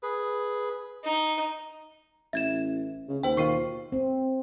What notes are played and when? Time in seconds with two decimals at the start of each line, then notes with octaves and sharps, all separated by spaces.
0.03 G#4 B4
1.04 D#4
2.33 A1 E5 G#6 E7
3.08 C#3
3.23 D#2 C5 G5
3.37 B2 D#3 F4 C#6 C7 D#7
3.92 C4